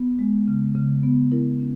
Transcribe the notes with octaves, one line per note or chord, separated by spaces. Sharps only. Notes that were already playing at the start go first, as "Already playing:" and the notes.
Already playing: B3
G#3
C#3
C#3
B3
E4 A#4
C#4